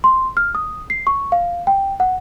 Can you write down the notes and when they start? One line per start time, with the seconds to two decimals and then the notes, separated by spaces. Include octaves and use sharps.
0.04 C6
0.37 F6
0.55 D#6
0.90 C7
1.07 C#6
1.32 F5
1.67 G5
2.00 F#5